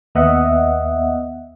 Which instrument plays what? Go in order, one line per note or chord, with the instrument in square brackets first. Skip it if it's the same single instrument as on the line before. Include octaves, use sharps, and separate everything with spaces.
[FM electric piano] D#2 B3 D#5 E5 F#5